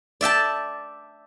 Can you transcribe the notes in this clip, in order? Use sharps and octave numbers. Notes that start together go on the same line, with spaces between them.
D5 E5 G5 A5